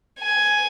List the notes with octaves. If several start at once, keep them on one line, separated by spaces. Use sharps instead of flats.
G#5